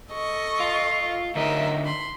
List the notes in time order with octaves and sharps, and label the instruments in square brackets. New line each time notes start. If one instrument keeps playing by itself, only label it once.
[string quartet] A4 D#5 C#6
[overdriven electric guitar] F4
[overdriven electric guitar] D2 D#5 [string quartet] D#4 A#4 E5
[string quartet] B5 C6